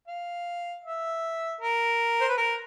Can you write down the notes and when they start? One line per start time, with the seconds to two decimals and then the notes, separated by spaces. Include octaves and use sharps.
0.08 F5
0.84 E5
1.61 A#4
2.21 C5
2.29 B4
2.38 A#4